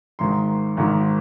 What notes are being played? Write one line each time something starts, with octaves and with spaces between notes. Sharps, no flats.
G#1 G#2 D#3 C6
G#1 G#2 D#3